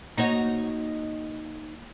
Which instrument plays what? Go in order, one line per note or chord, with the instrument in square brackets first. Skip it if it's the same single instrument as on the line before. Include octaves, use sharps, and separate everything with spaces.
[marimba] A#3 [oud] D#4 F#4 C#5